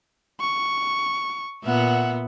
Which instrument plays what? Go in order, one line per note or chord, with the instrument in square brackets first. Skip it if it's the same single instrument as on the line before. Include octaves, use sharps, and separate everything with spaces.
[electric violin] C#6
[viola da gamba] A#2 B3 [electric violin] E5 F#5